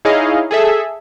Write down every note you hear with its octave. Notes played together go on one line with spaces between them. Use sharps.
D#4 E4 G#4 C#5 D#5 F5
G#4 A4 E5